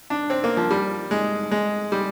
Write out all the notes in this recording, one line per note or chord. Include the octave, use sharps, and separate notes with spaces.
D4
C4
A#3
F3
G3
G#3
G#3
G3